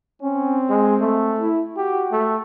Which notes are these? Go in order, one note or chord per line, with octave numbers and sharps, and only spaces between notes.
C4 C#4
G#3
A3
E4
F#4 G4
A3